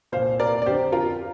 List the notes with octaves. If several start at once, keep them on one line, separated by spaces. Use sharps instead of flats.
C2 A#2 C5 F5
A#4 D5
D5
F2 D3 G4 C5
F4 A#4